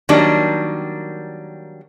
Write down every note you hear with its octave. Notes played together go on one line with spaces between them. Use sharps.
D#3 F#3 G3 A#3 D4